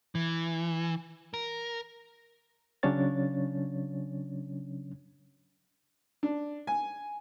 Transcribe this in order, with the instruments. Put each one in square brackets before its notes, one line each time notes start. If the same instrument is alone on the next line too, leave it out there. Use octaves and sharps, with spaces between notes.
[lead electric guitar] E3
A#4
[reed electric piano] C#3 F#3 C#4 D4 C#5 A6
[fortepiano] D4
G#5